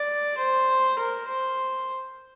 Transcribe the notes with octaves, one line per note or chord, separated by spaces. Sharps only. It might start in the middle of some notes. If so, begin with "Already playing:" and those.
Already playing: D5
C5
A#4
C5